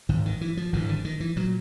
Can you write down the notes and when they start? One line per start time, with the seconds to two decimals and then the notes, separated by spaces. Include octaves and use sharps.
0.09 G#1 G#2 D#3
0.26 D#3
0.41 E3
0.57 F3
0.73 G#1 G2 D3 E3
0.89 D3
1.05 D#3
1.20 E3
1.36 A#2 F#3